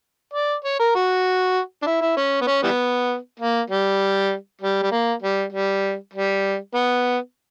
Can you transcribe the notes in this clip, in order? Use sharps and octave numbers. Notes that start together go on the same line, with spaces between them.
D5
C#5
A#4
F#4
D4
E4
E4
C#4
B3
C#4
E3 G3 B3
A#3
G3
G3
G3
A#3
G3
G3
G3
B3